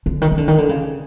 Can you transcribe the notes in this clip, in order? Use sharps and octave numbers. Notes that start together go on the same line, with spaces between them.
D3
D#3
D#3
D3
D#3
D3
C#3